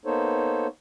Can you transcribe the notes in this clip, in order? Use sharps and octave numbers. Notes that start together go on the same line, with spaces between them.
A#3 B3 D#4 A4 C5 C#5